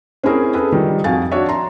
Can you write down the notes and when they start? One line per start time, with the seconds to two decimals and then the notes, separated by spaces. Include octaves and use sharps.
0.24 C4 C#4 E4 G#4 A#4 C5
0.54 G#4 A4 B4
0.72 D#3 F3 G3
1.04 F2 F#4 F5 G#5 A6
1.31 D4 F#4 C#5 E5
1.49 A#5 C6